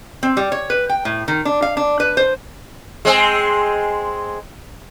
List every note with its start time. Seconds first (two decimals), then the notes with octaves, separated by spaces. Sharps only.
0.23 C4
0.37 G3
0.52 C#5
0.70 B4
0.89 G5
1.05 A2
1.28 D#3
1.45 D4
1.62 F5
1.77 D4
2.00 B4
2.17 C5
3.05 G#3 C4